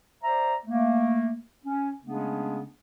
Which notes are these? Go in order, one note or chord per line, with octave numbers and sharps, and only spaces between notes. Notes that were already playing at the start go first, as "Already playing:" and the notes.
C5 D5 E5 A#5
A3 A#3
C#4
C#3 G#3 A3 B3 C#4 D4